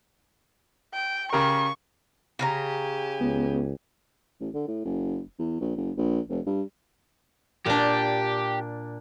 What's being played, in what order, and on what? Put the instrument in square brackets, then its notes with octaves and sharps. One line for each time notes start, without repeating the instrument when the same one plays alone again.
[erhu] G5
[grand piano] C#3 G4 A#4 [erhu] C#6
[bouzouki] C#3 A#4 A#5 [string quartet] G4 G#5
[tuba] C#2 [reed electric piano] B3
[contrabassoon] A1
D3
A2
F#1
E2
A#1
F#1
A#1
F1
G2
[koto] A#2 D4 [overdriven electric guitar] G4